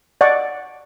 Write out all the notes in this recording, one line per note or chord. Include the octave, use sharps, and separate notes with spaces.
D5 D#5 F#5 C#6